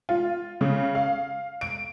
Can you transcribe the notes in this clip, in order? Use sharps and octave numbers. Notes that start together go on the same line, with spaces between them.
F4
C#3
F5
D7